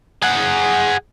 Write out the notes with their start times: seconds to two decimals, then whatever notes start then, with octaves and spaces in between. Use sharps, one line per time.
0.22 G#4 F#5